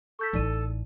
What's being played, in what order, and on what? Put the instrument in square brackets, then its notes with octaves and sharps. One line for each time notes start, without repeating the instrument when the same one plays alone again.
[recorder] A4 [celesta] C#6 G6 B6
[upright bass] A1 [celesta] D#4 D5 D#7